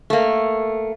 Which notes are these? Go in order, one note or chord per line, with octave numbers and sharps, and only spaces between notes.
A3 A#3